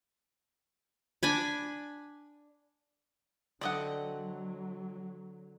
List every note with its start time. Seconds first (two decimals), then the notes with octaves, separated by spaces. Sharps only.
1.23 D4 G#5 B5
3.61 D3 F#3 C4 D5 D#5 F#5